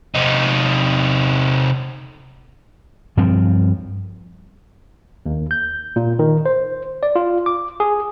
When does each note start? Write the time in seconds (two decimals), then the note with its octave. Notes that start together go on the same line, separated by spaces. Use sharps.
0.15 C3 D#4
3.17 G2 F3 C4
5.26 D#2
5.51 G6
5.96 A#2
6.19 D#3
6.46 C5
7.03 D5
7.16 F4
7.46 D6
7.80 G#4